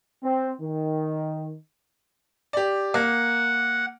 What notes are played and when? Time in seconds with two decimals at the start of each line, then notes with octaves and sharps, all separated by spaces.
0.23 C4
0.61 D#3
2.53 G4 D5
2.94 A#3 F#5